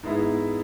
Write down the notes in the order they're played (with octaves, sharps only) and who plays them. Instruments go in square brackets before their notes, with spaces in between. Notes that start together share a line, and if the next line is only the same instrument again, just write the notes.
[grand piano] G#2 G#3 B3 E4